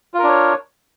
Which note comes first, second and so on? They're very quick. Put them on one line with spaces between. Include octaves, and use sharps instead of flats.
F4 A#4 D4 C#5